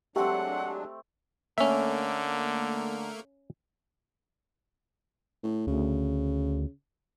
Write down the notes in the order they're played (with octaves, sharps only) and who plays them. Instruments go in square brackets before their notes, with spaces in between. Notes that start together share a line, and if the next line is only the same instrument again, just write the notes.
[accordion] F#3 G#3 D4 [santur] A3 C4 [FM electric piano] G4 [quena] F#5
[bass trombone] D3 [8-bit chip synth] A3 A#3 A#4 [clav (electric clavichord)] C#4 E5
[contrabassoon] A2
[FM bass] D2 [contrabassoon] C#3